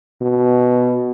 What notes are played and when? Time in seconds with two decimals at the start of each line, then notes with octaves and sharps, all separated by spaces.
0.21 B2